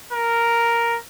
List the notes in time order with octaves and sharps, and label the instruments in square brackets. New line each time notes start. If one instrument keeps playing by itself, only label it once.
[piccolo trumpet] A#4